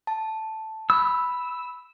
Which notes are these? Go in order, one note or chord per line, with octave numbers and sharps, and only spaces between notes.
A5
B5 E6